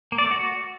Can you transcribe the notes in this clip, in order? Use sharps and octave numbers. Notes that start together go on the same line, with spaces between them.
A#3
D5
A3
F#4